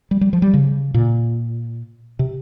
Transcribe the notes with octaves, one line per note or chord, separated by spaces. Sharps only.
G3
G3
F3
G3
C#3
A#2
C3